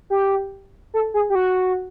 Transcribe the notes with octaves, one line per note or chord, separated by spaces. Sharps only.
G4
A4
G#4
G4
F#4